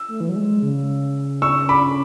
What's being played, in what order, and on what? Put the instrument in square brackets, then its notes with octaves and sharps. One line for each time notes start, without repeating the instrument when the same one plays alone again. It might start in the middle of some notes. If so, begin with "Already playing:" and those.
Already playing: [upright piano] E6
[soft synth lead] A3
E3
F#3
G#3
C#3
[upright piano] C#6 E6
B5 D6